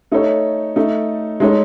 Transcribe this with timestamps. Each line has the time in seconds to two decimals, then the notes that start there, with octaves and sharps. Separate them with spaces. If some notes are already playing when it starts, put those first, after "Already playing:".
0.12 A3 D#4 A4 C#5
0.76 A3 D#4 A4
1.40 G#3 D#4 A4 C#5